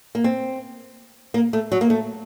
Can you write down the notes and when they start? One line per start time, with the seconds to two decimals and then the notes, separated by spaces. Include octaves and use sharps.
0.15 A#3
0.24 C4
1.34 A#3
1.53 A3
1.72 F#3
1.81 A#3
1.90 A3